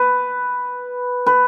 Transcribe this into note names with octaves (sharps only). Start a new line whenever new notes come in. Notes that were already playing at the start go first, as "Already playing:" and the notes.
Already playing: B4
B4